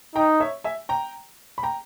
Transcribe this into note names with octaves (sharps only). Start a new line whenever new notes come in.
D#4 G5 A#5
C#5 E5
E5 G#5
G5 A#5
B5
G5 A#5